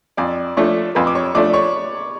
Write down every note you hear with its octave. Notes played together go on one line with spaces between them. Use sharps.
F2 D5 D6
F3 A3 D4 C#5 C#6
F2 B4 B5
D6
C#5 C#6
F3 A3 D4 D5 D6
C#5 C#6